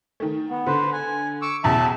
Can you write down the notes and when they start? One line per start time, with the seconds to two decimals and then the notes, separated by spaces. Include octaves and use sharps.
0.20 D#3 A3
0.50 B3
0.66 D3 B4 C5
0.93 G#5
1.42 C#6 D6 E6
1.64 A1 E2 B2 E5 A5